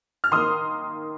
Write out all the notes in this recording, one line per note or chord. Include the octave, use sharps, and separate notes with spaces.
F6
D#3 A#3 C6 D#6